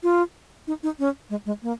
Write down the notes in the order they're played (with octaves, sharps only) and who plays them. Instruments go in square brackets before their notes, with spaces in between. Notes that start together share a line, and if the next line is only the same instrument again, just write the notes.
[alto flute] F4
D#4
D#4
C#4
G#3
G#3
A#3